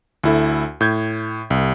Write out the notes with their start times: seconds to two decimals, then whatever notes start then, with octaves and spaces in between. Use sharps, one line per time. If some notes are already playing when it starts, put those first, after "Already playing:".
0.24 D2 E4 A4
0.81 A2 G6 G#6
1.50 C2